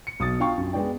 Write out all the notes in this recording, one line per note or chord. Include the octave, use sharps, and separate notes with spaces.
C#7
B1 D#6 A6
D4 F4 F5 G5 A5 C#6
F#2
G#3 B3 D4 D5 G5